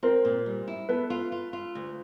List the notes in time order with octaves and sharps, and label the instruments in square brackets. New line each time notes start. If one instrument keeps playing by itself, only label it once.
[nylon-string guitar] C4 [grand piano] A#4 C5
[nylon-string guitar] A#2
G3
E4
[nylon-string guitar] B3 [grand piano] A4 B4
[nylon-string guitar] F4
F4
F4
D2